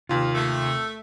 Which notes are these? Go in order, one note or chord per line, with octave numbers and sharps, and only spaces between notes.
D#2 C3 F4
A3